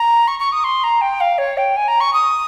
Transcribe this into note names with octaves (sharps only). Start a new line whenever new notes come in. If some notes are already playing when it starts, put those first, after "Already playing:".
Already playing: A#5
C#6
C#6
D#6
C6
A#5
G5
F5
C#5
G5
G#5
A#5
C#6
D#6